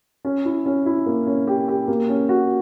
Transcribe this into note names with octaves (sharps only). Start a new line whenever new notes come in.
C#4
E4
C#4
E4
A#3
C#4
G4
G4
A#3
C#4
F#4